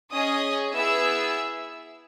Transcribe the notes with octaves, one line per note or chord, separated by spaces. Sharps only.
C#4 G#4 D#5 D#6
B3 E4 G#4 E5 E6